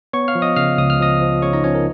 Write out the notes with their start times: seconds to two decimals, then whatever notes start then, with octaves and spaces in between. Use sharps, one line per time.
0.13 B3 C#5 C#6
0.28 F5 F6
0.35 F3
0.42 D#5 D#6
0.56 C#3 F5 F6
0.78 C#2 D#6
0.90 F6
1.00 F3 D#5 D#6
1.21 F3
1.42 C#3 C#5 C#6
1.53 D#4 D#5
1.64 F3 C#4 C#5
1.75 A#4